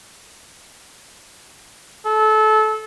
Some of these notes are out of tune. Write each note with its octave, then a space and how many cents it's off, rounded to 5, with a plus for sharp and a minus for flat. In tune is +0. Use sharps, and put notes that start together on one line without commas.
A4 -25